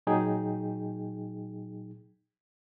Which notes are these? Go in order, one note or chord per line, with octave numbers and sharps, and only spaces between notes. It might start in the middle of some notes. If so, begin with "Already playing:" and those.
A#2 F#3 D#4 G#4 G5